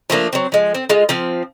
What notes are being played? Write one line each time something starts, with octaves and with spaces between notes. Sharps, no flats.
F3 A3 A#3 D4
F#3 C4
F3 G#3
C4
G#3 F4
F3 C4 F5